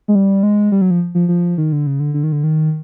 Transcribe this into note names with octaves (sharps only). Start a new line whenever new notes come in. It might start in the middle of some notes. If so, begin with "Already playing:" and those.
G#3
G3
G#3
G3
F#3
F3
F3
F3
D#3
D3
C#3
D3
D3
D#3
D3
D#3